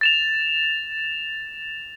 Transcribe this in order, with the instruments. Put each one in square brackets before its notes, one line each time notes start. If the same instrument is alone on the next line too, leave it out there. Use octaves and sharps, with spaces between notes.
[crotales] A6 E7 F7